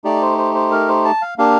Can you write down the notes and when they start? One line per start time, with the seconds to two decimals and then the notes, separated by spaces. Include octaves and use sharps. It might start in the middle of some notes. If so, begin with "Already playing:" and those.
0.04 A3 D#4 G4 D5
0.22 C5
0.38 C5
0.55 C5
0.71 A#4
0.88 C5
1.05 A5
1.22 F5
1.38 A#3 D4 G4 F5